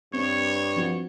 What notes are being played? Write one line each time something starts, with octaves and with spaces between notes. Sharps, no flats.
G2 C4 C#5
F3 C4 F#4